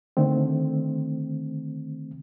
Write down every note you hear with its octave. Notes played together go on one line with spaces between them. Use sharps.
D3 D#3 A3 C4